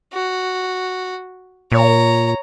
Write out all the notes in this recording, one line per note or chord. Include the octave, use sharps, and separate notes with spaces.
F#4
A#2 C#5 A#5